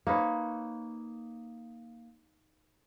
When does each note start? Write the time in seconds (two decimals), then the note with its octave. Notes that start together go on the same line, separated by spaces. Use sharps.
0.07 A#3 D#4 B4 C#5